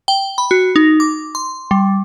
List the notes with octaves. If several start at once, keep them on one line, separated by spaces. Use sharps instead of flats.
G5
B5
F#4
D#4
D6
C6
G3